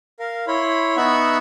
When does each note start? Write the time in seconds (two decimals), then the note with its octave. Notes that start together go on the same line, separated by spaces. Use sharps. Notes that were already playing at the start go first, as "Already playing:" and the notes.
0.19 A#4 F5
0.47 E4 C#5 B5 C6
0.97 B3 D#4 E5 F#5 B5 C#6